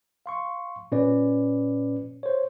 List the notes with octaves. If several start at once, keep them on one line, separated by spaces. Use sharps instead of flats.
F5 C6 C#6
A#2 C#4 B4 D5
C5 C#5